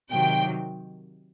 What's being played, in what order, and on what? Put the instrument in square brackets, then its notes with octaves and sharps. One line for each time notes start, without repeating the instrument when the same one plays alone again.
[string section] C3 D#3 F#3 G5